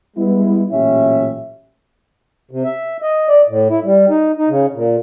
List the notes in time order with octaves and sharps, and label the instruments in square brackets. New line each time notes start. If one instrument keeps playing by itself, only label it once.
[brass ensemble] G3 G#3 B3 E4
A1 A#2 F#3 C#4 G4 E5
[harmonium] C3
E5
D#5
D5
A2
E4
G3
D#4
D#4
C#3
A#2